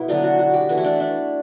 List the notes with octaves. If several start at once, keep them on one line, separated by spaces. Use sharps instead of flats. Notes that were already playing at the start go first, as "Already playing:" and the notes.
Already playing: B2 E4
D3 F#3 B3 D4
F#4
F#4
G4
E3 A3 F#4
E4
D4
D4